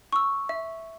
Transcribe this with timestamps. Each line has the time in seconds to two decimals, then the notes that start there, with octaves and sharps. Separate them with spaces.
0.13 C#6 E6
0.49 E5